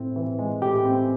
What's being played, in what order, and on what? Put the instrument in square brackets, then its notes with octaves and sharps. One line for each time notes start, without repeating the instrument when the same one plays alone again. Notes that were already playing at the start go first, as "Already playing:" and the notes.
Already playing: [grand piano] A2 C4
E3
G#3
[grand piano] A2 [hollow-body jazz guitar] G4
[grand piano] C4